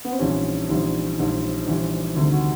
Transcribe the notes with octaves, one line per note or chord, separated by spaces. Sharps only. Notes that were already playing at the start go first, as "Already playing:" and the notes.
B3
C4
A#1 G#2 E3 G3 C#4
A#1 G#2 E3 G3
A#1 G#2 E3 G3
A#1 G#2 E3 G3
D2 C3 D#3 G3
F#4